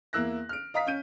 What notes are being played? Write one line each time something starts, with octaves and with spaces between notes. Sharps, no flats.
E2 A#3 E4 E6 F#6 A#6
F6 D7
D#5 F5 A#5 D#6 B6
C#4 G6 D#7